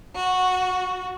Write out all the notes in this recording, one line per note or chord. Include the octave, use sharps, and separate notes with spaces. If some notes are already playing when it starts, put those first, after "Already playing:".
F#4